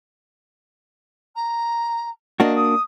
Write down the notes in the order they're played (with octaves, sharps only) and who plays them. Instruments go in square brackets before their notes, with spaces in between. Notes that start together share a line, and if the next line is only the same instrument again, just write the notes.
[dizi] A#5
[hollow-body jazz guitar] A#3 D4 F#4 [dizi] D#5
[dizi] D#6